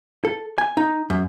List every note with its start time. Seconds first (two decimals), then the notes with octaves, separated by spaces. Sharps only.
0.25 A4
0.58 G#5
0.77 D#4
1.10 F#2